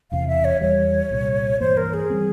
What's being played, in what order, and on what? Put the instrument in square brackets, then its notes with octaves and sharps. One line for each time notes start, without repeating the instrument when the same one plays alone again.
[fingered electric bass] E1 E2 C3 [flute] F5
[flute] E5
C#5
[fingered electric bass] E2 E3 G3 [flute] C#5
[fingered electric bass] C2 A#2 G3
[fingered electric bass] G2 E3 A#3 [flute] C5
[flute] A#4
G#4
[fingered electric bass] E3 G3 C4